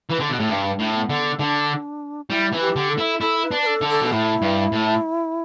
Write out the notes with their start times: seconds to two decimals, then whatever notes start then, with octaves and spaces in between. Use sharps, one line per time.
0.10 E3
0.20 D3
0.29 B2
0.39 A2
0.48 G2 D4
0.79 A2
0.94 B3
1.09 D3
1.39 D3 D4
2.30 G3 E4
2.52 E3
2.61 G4
2.76 D3
2.90 A4
2.98 E4
3.21 E4 A4
3.44 B4
3.51 D4
3.62 B4
3.66 A4
3.81 D3
3.90 A4
4.02 B2
4.12 A2 E4
4.42 G2
4.72 A2